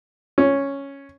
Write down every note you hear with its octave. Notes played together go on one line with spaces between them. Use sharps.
C#4